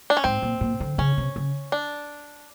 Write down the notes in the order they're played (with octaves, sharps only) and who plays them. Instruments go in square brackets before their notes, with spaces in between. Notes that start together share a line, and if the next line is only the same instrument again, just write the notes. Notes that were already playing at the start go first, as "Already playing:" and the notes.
[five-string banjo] D4
C#4
[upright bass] G#2 [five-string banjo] C4
[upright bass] A#2
A#2
D3
[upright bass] C#3 [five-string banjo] C#4
[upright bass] C3
C#3
[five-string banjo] D4